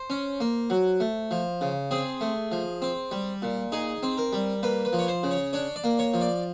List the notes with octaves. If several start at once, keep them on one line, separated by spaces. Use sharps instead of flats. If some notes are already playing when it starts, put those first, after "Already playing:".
Already playing: C5
C#4
A#3
F#3
A3
F3
C#3
C4 G#4
A3
F3
C4
G3
A#2
D#4 G#4
C4
A#4
G3
A#3 B4
B4
F3
C#5
C5
C#3
C#5
D4 C#5
D5
A#3
C#5
F3
D5